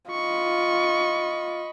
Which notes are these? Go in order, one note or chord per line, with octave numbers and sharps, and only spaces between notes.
F4 D#5 B5 C#6